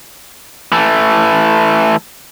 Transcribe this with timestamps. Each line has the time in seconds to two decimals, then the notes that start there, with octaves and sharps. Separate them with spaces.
0.72 E3 A3